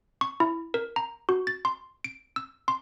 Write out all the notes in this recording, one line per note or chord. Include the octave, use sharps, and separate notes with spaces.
C#6
E4
A#4
A#5
F#4
A6
C6
D7
E6
C6